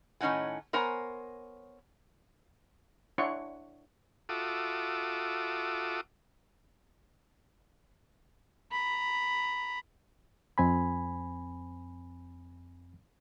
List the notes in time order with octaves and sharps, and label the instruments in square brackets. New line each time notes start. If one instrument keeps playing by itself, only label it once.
[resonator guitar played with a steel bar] A2 D#3 C#4 D#4 F#5 G#5
B3 A#4 C5 C#5 G#5 A#5
[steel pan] D4 E4 C#5 F#5 C6 C#6
[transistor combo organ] F4 F#4 A4 E5 D6 D#6
[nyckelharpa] A#5 B5
[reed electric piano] F2 C4 G#5 B5